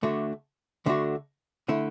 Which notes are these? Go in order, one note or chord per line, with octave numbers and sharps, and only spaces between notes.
D2 D3 A3 D4 F#4
D2 D3 A3 D4 F#4
D3 A3 E4